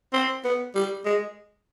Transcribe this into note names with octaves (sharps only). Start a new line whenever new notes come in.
C4
B3
G3
G#3